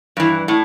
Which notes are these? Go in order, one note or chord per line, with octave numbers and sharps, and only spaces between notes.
G2 E3
A2